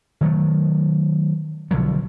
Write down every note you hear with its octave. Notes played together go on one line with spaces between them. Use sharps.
D#3 F#3 A3
B1 D3 F3 F#3